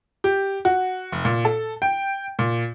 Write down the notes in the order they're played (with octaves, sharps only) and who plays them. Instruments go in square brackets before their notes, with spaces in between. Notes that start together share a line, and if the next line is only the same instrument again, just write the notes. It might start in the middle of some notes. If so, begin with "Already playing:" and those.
[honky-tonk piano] G4
F#4
F1
A#2
A4
G5
A#2